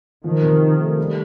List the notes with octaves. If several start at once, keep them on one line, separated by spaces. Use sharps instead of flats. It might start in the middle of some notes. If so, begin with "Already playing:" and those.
D#3 F3
C3
D#4
A3
G3